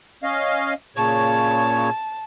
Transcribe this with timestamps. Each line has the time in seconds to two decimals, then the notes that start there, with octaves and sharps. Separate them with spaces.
0.23 C#4 D#5 F5
0.96 A#2 C#3 C#5 A5